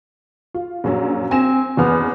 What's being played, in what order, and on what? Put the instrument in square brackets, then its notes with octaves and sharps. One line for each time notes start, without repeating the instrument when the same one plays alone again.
[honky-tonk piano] F4
A#1 F#2 F#3
[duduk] C4 [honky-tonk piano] G#5 A#6 E7
[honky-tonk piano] F#1 E2 F6 [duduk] B3